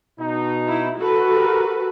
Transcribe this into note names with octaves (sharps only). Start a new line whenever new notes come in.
B2 D#4
E4
F#4 A4 B4
G4 A#4